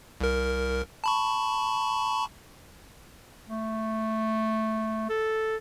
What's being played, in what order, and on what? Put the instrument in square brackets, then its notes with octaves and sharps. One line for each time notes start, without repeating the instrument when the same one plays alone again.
[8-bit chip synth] C2 A#4
A5 B5 C#6
[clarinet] A3
A4